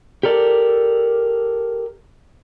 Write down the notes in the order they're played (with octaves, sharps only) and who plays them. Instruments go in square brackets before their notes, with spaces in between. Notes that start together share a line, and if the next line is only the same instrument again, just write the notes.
[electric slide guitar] G4 A4 A#4 D5